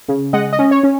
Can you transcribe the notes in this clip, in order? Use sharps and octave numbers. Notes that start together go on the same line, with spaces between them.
C#3
G#3 D#5 F#5
D#5
C#4
C#5
C#4